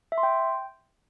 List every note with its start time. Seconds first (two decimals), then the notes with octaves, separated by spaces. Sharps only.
0.12 E5
0.18 C6
0.23 G5